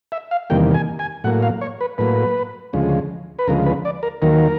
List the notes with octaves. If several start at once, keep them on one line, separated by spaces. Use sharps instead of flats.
E5
F5
E2 C3 D#3 G3 A#3 G5
G#5
G#5
A2 F#3 A#3 F#5
F5
C#5
B4
A2 F#3 A#3 B4
D2 C#3 F3 G#3
B4
D2 C#3 F3 G#3 A#4
B4
D5
A#4
D#2 D#3 F#3 A#3 A#4